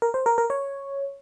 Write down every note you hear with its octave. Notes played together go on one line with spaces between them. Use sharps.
A#4
C5
A#4
A#4
C#5